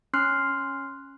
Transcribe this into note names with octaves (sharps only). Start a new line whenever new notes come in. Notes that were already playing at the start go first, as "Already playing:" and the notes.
C#4 C6 F6 F#6 C7